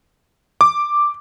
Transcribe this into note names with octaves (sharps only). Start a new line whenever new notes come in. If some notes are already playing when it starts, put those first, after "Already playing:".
D6